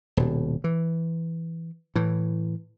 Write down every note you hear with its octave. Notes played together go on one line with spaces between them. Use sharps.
D#1 B2
E3
A2 E3